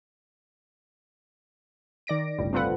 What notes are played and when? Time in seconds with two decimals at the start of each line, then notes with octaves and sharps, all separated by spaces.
2.07 D#3 D5 A#6 D7
2.38 G1 C#2 A2 G3
2.53 C4 D4 F4 A4 B4 F#5